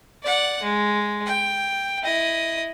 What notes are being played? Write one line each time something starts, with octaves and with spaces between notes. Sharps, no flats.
D5 F#5
G#3
G5
E4 D#5